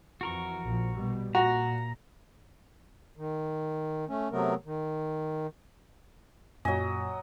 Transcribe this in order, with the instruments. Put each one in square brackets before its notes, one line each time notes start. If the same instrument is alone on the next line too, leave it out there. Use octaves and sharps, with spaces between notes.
[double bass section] F2 E3 [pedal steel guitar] F#4 A#4 C#6
[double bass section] A#1 A#2 F3
B2 G3
[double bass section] A#2 [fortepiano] F#4 [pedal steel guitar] A#5
[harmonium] D#3
A3 C#4
C3 F#3 A3 B3 A#4
D#3
[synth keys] F#2 A#2 G#5 [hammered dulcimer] F#3 D#5